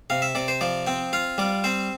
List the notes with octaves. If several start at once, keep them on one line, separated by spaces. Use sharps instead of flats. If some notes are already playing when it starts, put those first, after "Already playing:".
C3 F5
E5
C3 D5
C5
F3 D5
C4 G5
F4 F5
G3 D5
C4 C5